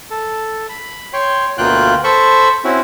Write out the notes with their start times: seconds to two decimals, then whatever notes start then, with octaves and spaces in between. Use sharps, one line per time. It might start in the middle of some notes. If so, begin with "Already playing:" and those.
0.11 A4
0.69 B5
1.13 C#5 G5 C6
1.58 D2 B2 A#3 F4 G5 F#6
2.04 A4 C5 B5 C#6
2.64 C4 C#4 E4 F#4